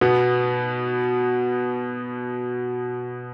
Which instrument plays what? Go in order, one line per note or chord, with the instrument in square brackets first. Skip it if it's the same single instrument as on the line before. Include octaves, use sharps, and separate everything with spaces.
[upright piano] B2 B3